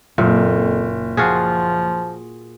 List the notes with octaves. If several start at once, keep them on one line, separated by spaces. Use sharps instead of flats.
F#1 F2 A#2
F3 F4 F#4 G#4